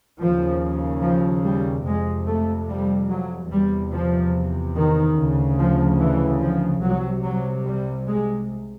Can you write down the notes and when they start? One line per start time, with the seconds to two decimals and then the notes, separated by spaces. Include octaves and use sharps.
0.20 D#2 C#3 F3
1.03 F3
1.45 G3
1.86 F2 C3 G#3
2.27 A3
2.69 G3
3.10 F#3
3.51 E2 C3 G3
3.93 F3
4.76 D#3
5.17 D2 C#3
5.59 F3
6.01 E3
6.41 F3
6.83 C2 C3 F#3
7.25 F#3
7.66 G3
8.07 G#3